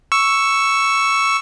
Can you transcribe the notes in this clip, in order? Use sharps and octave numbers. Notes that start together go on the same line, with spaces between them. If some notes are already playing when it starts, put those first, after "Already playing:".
C#6 E6